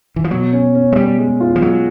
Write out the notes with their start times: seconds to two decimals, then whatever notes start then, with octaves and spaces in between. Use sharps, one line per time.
0.16 E3
0.24 F3
0.31 B2 F#3
0.53 C#4
0.75 C#4
0.92 G#3
0.96 G3 C#4
1.19 G#3
1.41 F4
1.56 F3
1.62 F#3 G#3